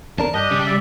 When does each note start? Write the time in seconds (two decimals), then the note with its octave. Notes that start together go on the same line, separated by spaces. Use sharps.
0.19 E2 D4 A#4 A5
0.34 G2 D4 G4 D#5 D#6
0.51 C#3 G3
0.66 D5 E5